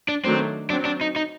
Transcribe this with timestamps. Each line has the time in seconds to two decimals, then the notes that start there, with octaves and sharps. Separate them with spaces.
0.09 D4
0.24 D#3 F#3 A3 C4 D4
0.70 F#3 C4 D4 F#4
0.85 D4
1.01 D#4
1.16 D#4